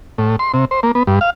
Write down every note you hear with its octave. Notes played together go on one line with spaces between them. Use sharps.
A2
C6
C3
C5
A#3
B3
G2
F5